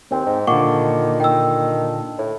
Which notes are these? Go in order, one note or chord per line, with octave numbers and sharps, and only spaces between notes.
D#2 C4
G#2
A#2 D3 D#3 F#5 C#6 D6
D#3 G5 E6
A2